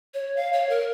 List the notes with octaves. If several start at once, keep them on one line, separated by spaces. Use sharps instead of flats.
C#5
F5
C#5
A#4